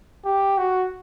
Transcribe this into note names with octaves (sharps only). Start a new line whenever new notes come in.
G4
F#4